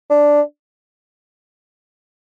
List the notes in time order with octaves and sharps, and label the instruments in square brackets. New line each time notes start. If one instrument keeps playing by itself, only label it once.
[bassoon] D4